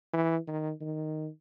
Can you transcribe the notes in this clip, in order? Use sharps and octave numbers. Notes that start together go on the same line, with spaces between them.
E3
D#3
D#3